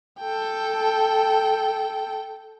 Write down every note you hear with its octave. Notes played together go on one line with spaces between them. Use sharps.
A4 G5